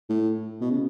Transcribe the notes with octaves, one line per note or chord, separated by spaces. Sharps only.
A2
B2
C#3